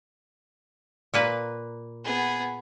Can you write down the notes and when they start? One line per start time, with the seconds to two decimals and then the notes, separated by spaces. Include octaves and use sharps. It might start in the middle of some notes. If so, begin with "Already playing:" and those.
1.14 A#2 A#3 B4
2.04 B3 G#4